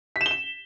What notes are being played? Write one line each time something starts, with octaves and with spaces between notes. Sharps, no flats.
B6
E7
G7
E7